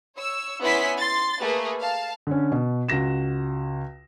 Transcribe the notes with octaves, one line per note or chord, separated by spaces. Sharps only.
C#5 E6
B3 C#4 E4 G#5 C6 B6
C6 A6
A3 A#3 G#4 B4
F5 A5
D3 C#4
B2
C#2 F#4 A#6 E7